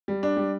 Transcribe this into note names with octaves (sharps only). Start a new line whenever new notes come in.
G3
D4
G3